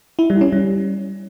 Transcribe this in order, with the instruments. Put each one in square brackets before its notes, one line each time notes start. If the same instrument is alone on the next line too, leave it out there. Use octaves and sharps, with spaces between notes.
[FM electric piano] E4
G3
C#4
G3